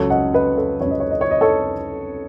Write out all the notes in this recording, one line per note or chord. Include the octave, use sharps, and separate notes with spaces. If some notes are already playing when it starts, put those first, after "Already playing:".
Already playing: C#2 C#3 F#3 A4 C#5
D#5 F#5
B4 D#5
A4 C#5
C#2 C#3 F#3 C#5
D#5
C#5
D#5
C#5
D#5
A4 C#5